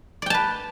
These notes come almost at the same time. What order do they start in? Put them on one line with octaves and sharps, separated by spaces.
D5 G5 A5 B4